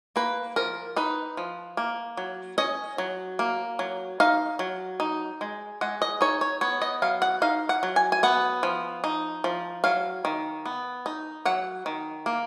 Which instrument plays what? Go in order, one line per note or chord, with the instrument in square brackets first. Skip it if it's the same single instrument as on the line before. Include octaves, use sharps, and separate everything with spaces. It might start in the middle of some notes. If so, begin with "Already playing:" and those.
[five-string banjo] A#3 B4
F3 A#4
D#4 B4
F3
A#3
F#3
C#4 D#5
F#3
A#3
F#3
D#4 F5
F#3
D#4
G#3
G#3 F#5
D#5
D#4 C#5
C#5
B3 C#5
D#5
F#3 F5
F#5
D#4 F5
F#5
F#3
G#5
G#5
B3 F#5
F3
D#4
F3
F#3 F5
D#3
B3
D#4
F#3 F#5
D#3
A#3